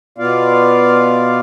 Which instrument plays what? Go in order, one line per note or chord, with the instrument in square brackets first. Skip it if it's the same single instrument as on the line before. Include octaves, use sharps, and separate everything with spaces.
[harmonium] B2 B3 F4 D5 F5